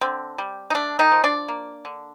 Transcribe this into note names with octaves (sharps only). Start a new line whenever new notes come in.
D3 C4
G3
D#4
A3 D4
D#3 D#4
F3
D4 D5
A#3
D3